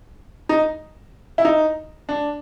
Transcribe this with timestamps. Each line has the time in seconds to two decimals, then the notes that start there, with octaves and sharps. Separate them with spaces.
0.49 D#4
1.38 E4
1.45 D#4
2.09 D4